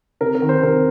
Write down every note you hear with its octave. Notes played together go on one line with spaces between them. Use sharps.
C3 A#4
A#4
D#3
C5
C3 A#4